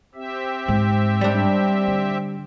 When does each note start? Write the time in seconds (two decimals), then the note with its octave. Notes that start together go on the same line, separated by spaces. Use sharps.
0.15 C4 G4 E5
0.68 G#2
1.21 G3 D4
1.87 D3